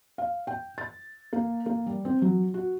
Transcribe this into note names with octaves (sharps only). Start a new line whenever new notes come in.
F5
G5
A6
A#3
A#3
G3
C4
F#3
F#4